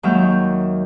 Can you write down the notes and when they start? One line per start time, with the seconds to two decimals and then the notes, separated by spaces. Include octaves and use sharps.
0.03 D#2 F#3 G#3 E5 F6 G6